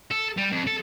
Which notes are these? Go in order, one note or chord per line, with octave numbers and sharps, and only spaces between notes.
A4
G3
F2
A4